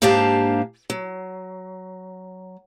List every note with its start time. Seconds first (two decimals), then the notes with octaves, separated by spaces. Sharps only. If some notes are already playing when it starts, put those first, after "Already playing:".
0.02 G#2 A#3 D4 G4 F5 A5
0.90 F#3